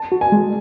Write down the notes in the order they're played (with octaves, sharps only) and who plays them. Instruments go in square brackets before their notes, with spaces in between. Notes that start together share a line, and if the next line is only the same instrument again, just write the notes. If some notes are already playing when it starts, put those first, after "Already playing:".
Already playing: [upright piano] A5
[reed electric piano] F#4
[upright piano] G#5
[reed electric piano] G#3